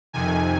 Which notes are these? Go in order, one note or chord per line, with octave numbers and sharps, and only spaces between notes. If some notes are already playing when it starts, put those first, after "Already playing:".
F2 C3 D#3 G#5